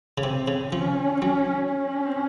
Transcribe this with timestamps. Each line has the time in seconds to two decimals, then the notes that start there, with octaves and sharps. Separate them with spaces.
0.18 C#3
0.23 C3 C4
0.48 C#3
0.72 F3 C#4
1.22 F#3
1.71 C#4